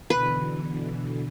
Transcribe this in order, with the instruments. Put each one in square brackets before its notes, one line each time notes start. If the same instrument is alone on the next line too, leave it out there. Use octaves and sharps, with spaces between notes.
[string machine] B2 D3 E3 [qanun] B4